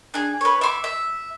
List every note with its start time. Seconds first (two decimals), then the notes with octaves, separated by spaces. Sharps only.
0.14 D4 G#4
0.41 B4 C#5
0.61 E5 C6 D6
0.84 E5